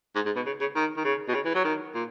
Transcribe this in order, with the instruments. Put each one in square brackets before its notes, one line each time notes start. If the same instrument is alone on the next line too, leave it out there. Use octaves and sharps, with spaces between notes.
[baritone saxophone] G#2
G#2
B2
C#3
C#3
D#3
D#3
C#3
B2
C#3
E3
F#3
D#3
A#2